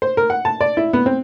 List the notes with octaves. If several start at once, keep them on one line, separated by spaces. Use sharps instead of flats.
C5
A#4
F#5
A5
D5
E4
B3
C4